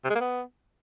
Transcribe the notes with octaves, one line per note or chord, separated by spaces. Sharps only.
C3
G#3
A#3
B3